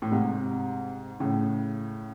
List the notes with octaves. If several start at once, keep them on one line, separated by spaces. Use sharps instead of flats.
A2
G#2 C3
A2 C#3